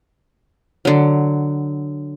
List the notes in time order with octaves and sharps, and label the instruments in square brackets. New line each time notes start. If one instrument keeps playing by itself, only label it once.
[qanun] D3 F#3